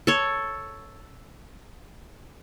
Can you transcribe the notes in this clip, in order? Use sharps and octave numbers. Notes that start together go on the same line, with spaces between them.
A4 C#5